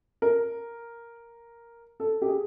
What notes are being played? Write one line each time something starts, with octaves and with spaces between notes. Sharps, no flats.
A#4
A4
G4
G#4